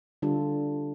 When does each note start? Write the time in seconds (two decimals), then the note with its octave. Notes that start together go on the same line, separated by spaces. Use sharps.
0.22 D3 G3 D4 F4 A4